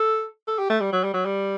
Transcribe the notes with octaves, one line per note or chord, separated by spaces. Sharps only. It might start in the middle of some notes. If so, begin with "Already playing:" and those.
Already playing: A4
A4
G4
A3
G3
F#3
G3
F#3
G3